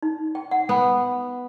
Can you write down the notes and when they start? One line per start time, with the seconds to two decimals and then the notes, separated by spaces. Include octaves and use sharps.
0.02 D#4
0.35 G5
0.51 F#5
0.69 B3